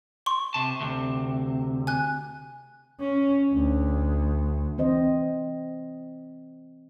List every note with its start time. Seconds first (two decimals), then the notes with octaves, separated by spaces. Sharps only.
0.26 C6 C#6
0.54 C3 A5
0.81 D2 C3
1.87 G#5 F#6
3.00 C#4
3.53 D2
4.78 E3 C4 C5 D#5